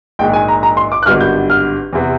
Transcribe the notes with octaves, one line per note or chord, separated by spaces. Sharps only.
A#1 G#2 D#3 G5
G#5
A#5
A#5
C6
D6
F#6
G#1 G2 D3 G3 B3 F6
G6
F6
E2 C3 E3